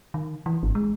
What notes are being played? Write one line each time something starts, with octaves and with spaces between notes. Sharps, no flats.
D#3
E3
G#1
G#3